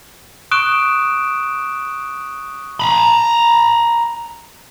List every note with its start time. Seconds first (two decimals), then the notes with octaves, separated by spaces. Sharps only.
0.51 C#6 D#6 F#6 D7 E7
2.80 A#5 B5